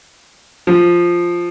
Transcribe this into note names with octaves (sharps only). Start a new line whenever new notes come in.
F3